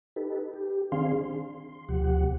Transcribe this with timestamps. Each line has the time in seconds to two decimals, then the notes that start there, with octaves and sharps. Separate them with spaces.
0.16 D#4 G4 A4 B4
0.54 G4
0.92 D#3 C4 D4 G#4 F5 C6
1.24 C6
1.89 D2 B2 F3 G4 F#5